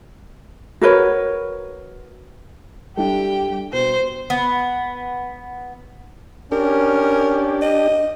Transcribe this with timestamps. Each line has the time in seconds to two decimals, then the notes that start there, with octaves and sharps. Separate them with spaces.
0.81 F#4 A#4 B4 C#5
2.98 G3 D4 E4 G4 A4 G5
3.73 B2 C5
4.30 B3
6.52 C#4 D4 G4 A#4
7.62 D#5